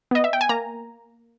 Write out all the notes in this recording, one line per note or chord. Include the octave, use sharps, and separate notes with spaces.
B3 D#5
E5
G5
G#5
A#3 A#5